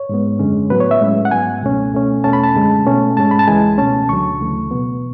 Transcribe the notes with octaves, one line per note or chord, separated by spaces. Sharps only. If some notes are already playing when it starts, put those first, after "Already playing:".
Already playing: C#5
G#2 G#3 B3
F#2 D3 G#3 C#4
A2 F#3 B3 B4
C#5
E5
A2 G#3 C#4
F#5
G#2 F#3 B3 G#5
C#2 B2 A3 C#4
B2 A3 C#4
E2 B2 A3 C#4 A5
B5
A5
F#2 D3 G#3 C#4
B2 A3 C#4
G#2 G#3 C#4 A5
B5
A5
C#2 C#3 E3 G#3 G#5
B2 A3 C#4 A5
D2 D3 F#3 C#6
D2 C#3 E3 A3
B2 F#3 B3